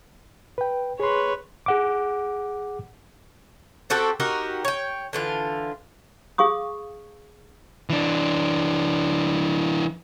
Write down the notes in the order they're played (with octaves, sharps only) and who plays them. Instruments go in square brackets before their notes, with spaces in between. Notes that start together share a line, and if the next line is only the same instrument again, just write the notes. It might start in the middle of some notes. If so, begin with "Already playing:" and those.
[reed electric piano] B4 G5
[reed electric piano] G#4 C6 [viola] B4 C#5
[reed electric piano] G#4 F#5 D6
[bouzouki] C4 F#4 G4 A4
D#4 F#4 G4 A#4
C#5 G5
D3 E3 F4
[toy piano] G#4 F5 C#6 D#6
[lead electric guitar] E3 D4